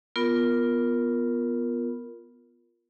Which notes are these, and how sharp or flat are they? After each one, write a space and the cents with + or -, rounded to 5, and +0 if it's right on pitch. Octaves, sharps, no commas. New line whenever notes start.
B3 -5 F4 +0 A#4 +0